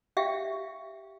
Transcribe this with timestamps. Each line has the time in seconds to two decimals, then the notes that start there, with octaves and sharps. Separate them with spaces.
0.17 G4 E5 F5 G5